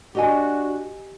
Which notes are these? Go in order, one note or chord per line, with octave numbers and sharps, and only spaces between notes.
D4 F#4 G4 D#5 G#5